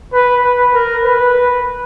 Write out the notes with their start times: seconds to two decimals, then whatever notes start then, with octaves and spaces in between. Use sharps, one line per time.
0.13 B4
0.43 B4
0.74 A#4
1.05 B4